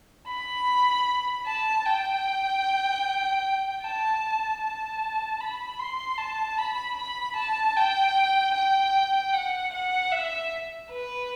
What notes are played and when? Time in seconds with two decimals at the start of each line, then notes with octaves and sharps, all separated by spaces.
0.28 B5
1.47 A5
1.86 G5
3.82 A5
4.61 A5
5.40 B5
5.80 C6
6.18 A5
6.59 B5
6.97 B5
7.37 A5
7.77 G5
8.54 G5
9.33 F#5
9.73 F#5
10.12 E5
10.91 B4